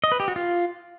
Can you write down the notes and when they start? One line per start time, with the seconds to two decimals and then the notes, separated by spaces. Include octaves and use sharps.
0.04 D#5
0.12 B4
0.20 G4
0.28 F#4
0.36 F4